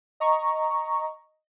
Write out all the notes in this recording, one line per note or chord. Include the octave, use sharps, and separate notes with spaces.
D#5 A#5 C#6